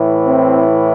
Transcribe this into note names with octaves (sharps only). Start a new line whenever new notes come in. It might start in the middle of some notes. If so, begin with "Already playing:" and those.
Already playing: A2 E3
C4